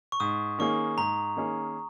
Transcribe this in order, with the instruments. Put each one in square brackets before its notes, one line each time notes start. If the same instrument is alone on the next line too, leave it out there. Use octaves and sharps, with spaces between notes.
[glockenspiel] C#6
[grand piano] G#2 [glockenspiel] D#6
[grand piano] D#3 A#3 C#4 G#4 [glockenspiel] C#6
[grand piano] G#2 [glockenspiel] A#5
[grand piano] D#3 A#3 C#4 G#4